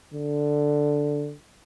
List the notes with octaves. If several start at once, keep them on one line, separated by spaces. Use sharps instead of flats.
D3